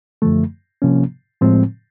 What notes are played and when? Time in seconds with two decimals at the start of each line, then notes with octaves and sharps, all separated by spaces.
0.22 F#2 D3 F3 A3
0.82 C3 F3 A#3 C#4
1.41 A2 F3 G#3 C4